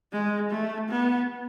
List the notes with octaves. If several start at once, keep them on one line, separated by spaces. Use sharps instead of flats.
G#3
A3
B3